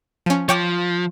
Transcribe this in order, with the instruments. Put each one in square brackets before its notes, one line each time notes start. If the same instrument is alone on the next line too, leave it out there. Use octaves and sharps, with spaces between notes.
[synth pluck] F3 C#4
[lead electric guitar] F3 [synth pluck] C#5 G5 D6